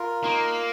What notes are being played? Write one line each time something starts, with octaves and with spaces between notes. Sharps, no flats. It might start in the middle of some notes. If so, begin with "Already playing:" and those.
Already playing: F4 A#4
A#3 D#4